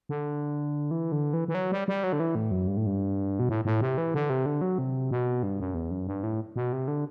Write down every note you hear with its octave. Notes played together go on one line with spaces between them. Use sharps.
D3
E3
D3
E3
E3
F#3
G3
G3
F#3
D3
E3
A2
F#2
G2
A2
G2
B2
A2
A2
C3
E3
D3
C3
D3
F#3
C3
B2
G2
F#2
E2
F#2
G2
A2
B2
C3
D3